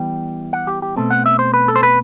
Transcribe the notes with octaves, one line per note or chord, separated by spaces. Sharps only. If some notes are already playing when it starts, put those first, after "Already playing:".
Already playing: E3 G3 B3 G5
F#5
G4
G4
B2 A3 C4 A4
F#5
E5
C5
B4
A4
C5
B4